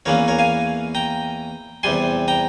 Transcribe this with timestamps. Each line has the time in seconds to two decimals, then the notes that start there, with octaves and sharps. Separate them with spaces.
0.06 E2 E3 A#3 C#4 A#4 C#5
0.28 A#4 C#5
0.39 F5 G#5
0.95 G5 A#5
1.83 E2 C3 G3 G#5 C6
2.28 G5 A#5